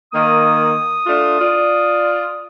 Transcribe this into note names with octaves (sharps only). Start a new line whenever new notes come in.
D#3 A#3 D#6
A3 D4 F4
F4 D5